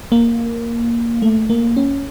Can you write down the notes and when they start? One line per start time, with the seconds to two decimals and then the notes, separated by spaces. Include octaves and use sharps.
0.12 A#3
1.22 A3
1.50 A#3
1.77 C#4